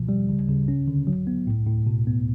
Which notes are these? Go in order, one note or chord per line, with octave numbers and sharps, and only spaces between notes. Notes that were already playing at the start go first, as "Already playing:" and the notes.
Already playing: B2 F3
G3
C#3
C#3
C#4
D3
F#3
B3
A2
A2
B2
B3